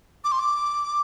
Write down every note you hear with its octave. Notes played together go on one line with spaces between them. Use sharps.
D6
C6
D6